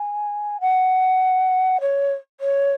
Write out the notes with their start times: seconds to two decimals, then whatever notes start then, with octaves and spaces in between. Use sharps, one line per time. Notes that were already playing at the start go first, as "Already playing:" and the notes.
Already playing: G#5
0.61 F#5
1.81 C#5
2.40 C#5